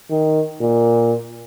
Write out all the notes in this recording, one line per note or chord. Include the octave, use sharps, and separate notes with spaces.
D#3
A#2